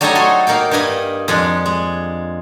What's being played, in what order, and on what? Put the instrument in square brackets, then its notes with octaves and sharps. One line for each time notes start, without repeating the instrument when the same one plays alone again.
[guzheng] F#3 G3 A3 D#4 C#5 D#5
F#4 A4 G#5 C6
A#3 D#4 F5 G5
G2 A#3 D#5 G#5 B5
F2 G#3 D4
G#3